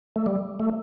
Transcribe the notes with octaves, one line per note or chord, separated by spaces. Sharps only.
A3
G3
A3